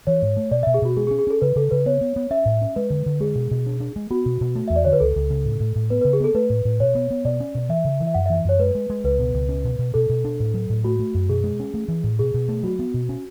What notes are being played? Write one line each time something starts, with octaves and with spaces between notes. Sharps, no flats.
E3 C#5
G#2
A3
B2 D5
B2 E5
G#4
B2 F#4
G#3 G#4
G#4
C#4
G#4
C#4 A4
C#3 B4
C#3 A4
C#3 B4
B3 C#5
B3
B3
C#4 E5
A2
C#4
G#3 B4
D3
D3
G#3 G#4
B2
B2
D4
D4
G#3
B3 F#4
B2
B2
A3
E2 E5
D5
D3 C#5
B4
C#2 A4
C#2
C#3
A2
A2
A2
B3 B4
C#3 B4
G#4
B3 A4
A3 B4
A2
A2
B2 C#5
B3
B3
B2 D5
C#4
B2
E3 E5
C#3
E3
E5
F#2 F#5
E3 E5
F#2 C#5
G#3 B4
G#3
G#3
C#2 B4
B2
C#2
C#4
B2
B2
B2 A4
B2
D4
A2
F#3
A2
A3 F#4
A3
F#2
B2 G#4
G#3
C#4
A3
E3
A2
B2 G#4
B2
A3
F#3 F#4
B3
B2
C#4